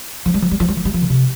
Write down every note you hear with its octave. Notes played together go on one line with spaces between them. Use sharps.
F3
G3
F3
G3
F3
G3
F3
G3
F3
D3
C3